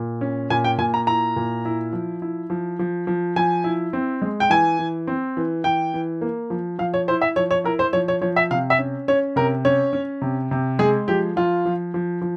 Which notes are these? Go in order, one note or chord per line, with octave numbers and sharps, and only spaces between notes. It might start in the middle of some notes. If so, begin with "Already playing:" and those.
Already playing: A#2
C#4
A#2 G#5
G5
A#2 G#5
A#5
E4 A#5
A#2
E4
F3
E4
F3
F3
F3
F3 G#5
E4
C4
G#3
G5
E3 G#5
E3
C4
E3
E3 G5
E3
A#3
F3
F3 F5
C#5
E4 C5
E5
F3 C#5
C#5
E4 A#4
C5
F3 C#5
C#5
F3 C#5
E5
C3 F5
E5
C#4
C#4 C#5
C3 A#4
C#4 C#5
C#4
C3
C3
G#3 G#4
F3 G4
F3 F4
F3
F3
F3